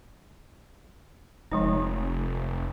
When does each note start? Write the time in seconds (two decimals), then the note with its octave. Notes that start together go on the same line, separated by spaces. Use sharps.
1.52 F1 F3 G#3 D#4